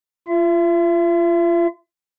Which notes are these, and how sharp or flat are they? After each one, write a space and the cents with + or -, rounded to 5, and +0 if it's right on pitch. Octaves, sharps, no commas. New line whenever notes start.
F4 -25 E5 +35